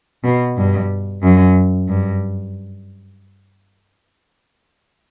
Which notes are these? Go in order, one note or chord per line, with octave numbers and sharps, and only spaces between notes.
B2
G2
F#2
G2